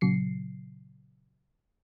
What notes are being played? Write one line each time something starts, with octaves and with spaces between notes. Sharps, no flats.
A#2 C#3 F#3 C7 C#7